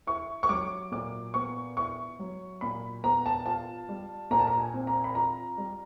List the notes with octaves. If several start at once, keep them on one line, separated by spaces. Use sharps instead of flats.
E4 C#6
C#6
F#3 D6
A#2 D6
B3 C#6
E4 C#6
F#3
A#2 B5
B3 A#5
A5
F4 A5
G3
A#2 A#5
A5
A#5
G#5
C4
A#5
B5
F4 A#5
G3